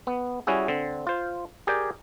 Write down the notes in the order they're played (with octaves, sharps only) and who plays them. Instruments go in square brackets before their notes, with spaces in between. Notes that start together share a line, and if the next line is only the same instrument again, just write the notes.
[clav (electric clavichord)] B3
G3 C#4 E4 F#4 G#4
D3 C4
F4 C5
G4 G#4 A#4 D5 G5